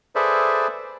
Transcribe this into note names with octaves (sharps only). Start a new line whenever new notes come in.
G#4 A4 B4 C5 D5 E5